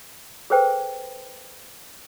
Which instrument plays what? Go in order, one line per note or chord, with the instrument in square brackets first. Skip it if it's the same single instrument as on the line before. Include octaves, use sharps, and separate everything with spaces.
[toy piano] G#4 A4 B4 C5 G5